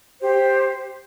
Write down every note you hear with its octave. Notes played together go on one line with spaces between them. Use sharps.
G4 C5